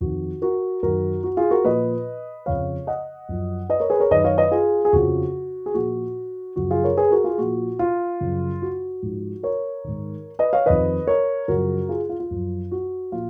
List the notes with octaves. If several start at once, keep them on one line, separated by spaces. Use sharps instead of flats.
F2 D#3 F#4
F#4 A#4
F#2 D#3 F#4 A#4
F#4
F4 G#4
F#4 A#4
A#2 F3 B4 D#5
F2 C#3 F3 C#5 F5
D#5 F#5
F#2 F3
B4 D#5
A#4 C#5
G#4 B4
A#4 C#5
F#2 D#3 B4 D#5
C#5 F5
B4 D#5
F4 G#4
G#4
F2 C#3 F3 F#4
G#4
A#2 F3 F#4
F#2 C#3 F3 F#4
F4 G#4
A#4 C#5
G#4 B4
F#4 A#4
F4 G#4
A#2 F3 F#4
F4
F#2 C#3 F3
F#4
G#2 F3
A#4 C#5
G#2 D#3
B4 D#5
C#5 F5
F2 D#3 B4 D#5
A#4 C#5
F#2 C#3 F3 F#4 A#4
F4 G#4
F4
F4
F#2 F3
F#4
A#2 F3 F4